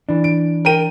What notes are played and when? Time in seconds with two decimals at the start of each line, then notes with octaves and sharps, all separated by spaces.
0.09 E3 D4
0.24 D7
0.65 A#4 G5 D#7